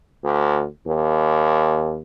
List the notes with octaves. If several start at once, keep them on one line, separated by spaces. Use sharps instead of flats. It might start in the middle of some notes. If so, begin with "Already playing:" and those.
D2
D#2